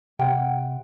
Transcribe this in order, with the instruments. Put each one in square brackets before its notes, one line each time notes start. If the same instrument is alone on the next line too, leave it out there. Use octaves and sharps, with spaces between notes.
[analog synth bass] C3 [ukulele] F#5 G5